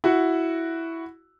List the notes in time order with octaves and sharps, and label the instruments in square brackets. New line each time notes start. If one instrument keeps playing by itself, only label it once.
[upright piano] E4 F#4